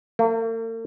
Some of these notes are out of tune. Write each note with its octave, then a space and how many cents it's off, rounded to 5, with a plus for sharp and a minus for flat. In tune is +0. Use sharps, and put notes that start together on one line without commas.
A#3 -45